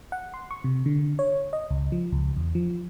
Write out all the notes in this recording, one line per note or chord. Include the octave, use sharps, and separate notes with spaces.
F#5
C6
C#6
C3
D3
C#5
D#5
C#2
F3
C#2
E2
F3